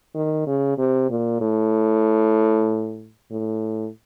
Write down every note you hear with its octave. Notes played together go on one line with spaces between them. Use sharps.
D#3
C#3
C3
A#2
A2
A2